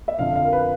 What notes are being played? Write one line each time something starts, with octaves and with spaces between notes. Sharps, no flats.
E5
F2 D3 F3 F5
F5
A#4
B4